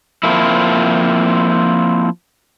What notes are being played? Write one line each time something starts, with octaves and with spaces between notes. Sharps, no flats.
F3 A#3 C4 E4